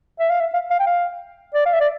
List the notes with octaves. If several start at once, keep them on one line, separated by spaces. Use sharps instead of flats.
E5
F5
E5
F5
F5
G5
F5
D5
F5
E5
D5